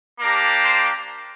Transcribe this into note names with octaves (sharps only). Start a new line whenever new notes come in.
A#3 D4 G4 A#4
C5